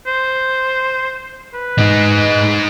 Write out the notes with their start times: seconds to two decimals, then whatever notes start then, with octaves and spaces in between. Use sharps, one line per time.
0.06 C5
1.54 B4
1.78 G#3 D#4